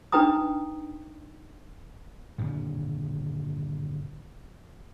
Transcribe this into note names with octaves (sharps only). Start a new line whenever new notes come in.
D4 D#4 B4 G5 A#5 D#6
G2 A#2 D3 D#3